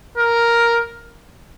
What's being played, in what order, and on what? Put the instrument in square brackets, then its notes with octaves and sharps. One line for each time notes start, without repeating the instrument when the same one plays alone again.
[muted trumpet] A#4